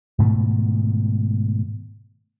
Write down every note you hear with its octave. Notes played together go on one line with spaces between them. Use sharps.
G#2 B2 D#3 A3